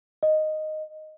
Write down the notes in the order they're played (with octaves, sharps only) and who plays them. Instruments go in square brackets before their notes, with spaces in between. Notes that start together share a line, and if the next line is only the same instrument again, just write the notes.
[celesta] D#5